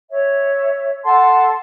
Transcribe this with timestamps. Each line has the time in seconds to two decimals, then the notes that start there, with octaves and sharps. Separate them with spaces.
0.09 C#5 E5
1.04 A4 F#5 A5 C6